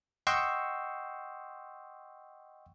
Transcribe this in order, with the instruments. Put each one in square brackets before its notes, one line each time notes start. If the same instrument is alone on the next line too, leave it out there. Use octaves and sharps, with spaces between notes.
[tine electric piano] D#5 F#5 G5 C6 C#6 E6